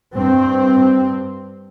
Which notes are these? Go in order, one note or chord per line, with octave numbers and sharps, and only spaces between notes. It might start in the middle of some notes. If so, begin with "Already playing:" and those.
G2 C4